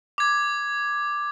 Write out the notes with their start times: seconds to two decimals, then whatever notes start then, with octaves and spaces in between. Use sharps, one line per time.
0.18 D6 G#6